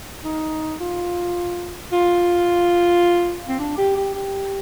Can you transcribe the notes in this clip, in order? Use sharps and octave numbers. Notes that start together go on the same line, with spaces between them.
D#4
F4
F4
C4
D4
G4
G4
G4